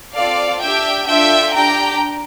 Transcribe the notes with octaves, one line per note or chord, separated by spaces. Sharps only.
C4 F4 A4 D5 F5
D4 G4 E5 G5
D4 F4 A4 E5 G5
D4 G4 G5 A#5